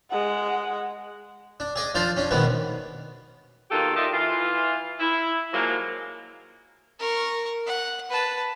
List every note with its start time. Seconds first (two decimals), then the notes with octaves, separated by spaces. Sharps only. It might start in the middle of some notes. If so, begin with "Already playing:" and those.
0.11 G#3 F#5
1.60 D4
1.76 G#4 D5 D#5
1.95 F3 D4 F4 C5 D5
2.16 C#4 D4
2.31 G#2 B2 D#3 G#3 B3
3.71 B2 D#3 A#3 F4 G4 A4
3.96 G3 F4 G4 A4 D#5 E5
4.13 E3 F4
5.00 E4
5.53 F3 F#3 G#3 A#3
7.00 A#4 C#6
7.67 F#5
8.10 B4 A5